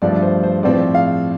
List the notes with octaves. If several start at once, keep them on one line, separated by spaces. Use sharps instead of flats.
G2 F3 A3 D5
C5
C5
A2 F3 C4 D5
F5